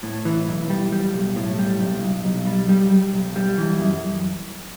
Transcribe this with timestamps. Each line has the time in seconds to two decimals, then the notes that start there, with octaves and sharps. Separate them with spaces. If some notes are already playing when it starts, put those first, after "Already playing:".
0.03 A2
0.25 E3
0.47 B1
0.70 G3
0.92 G3
1.14 B1
1.36 A2
1.59 G3
1.81 B1
2.03 B1
2.25 B1
2.46 G3
2.69 G3
2.91 G3
3.14 B1
3.36 G3
3.58 E3
3.80 F#2